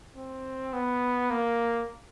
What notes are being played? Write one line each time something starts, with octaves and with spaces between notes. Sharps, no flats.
C4
B3
A#3